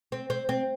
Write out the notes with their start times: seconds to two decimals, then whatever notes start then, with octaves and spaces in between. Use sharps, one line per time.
0.12 C4
0.30 C4
0.49 C4